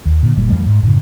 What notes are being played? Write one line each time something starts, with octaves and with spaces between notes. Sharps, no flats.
D#2
A#2 D3
F#1 A#2 G3
F2 E3 G3 A3
G#2
F#2 A2 C#3